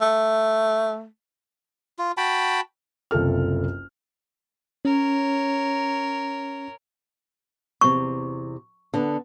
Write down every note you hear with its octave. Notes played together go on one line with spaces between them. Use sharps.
A3
F4
F#4 G5 A5 B5
F#1 C2 F4 A4 F6
C#4 A#4 C#5
E2 C3 C#6
D3 B3